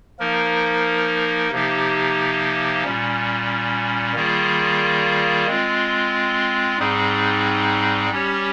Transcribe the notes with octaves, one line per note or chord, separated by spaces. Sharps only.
F3 A#3 D#4 A#4
C3 F3 A#3 D#4 G4
A#2 G3 C#4
D#3 G3 A#3 F4 G#4
G#3 C4 F4
G#2 G3 C4 D#4 G#4
G3 C#4 G4 C#5